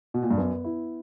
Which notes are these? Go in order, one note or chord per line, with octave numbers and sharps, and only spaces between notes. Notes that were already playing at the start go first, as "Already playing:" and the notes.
B2
A#2
G2
F#2 B3
E4